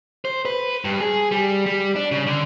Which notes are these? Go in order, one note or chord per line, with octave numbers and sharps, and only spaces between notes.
C5
B4
G2
G#4
G3
G3
D4
C#3
D3